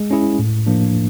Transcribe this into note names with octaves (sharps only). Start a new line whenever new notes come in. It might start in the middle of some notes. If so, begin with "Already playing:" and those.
Already playing: G#3
C#4 E4 G#4
A2
F3 A#3 D4